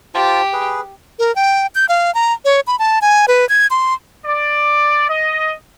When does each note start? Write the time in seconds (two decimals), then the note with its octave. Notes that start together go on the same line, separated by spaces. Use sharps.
0.15 F4 G4 C5 A5
0.53 G#4 B4
1.19 A#4
1.36 G5
1.75 G6
1.89 F5
2.15 A#5
2.45 C#5
2.67 B5
2.79 A5
3.02 G#5
3.28 B4
3.49 G#6
3.70 C6
4.26 D5
5.10 D#5